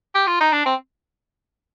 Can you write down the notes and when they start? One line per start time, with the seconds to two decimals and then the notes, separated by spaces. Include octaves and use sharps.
0.15 G4
0.27 F4
0.40 D#4
0.53 D4
0.66 C4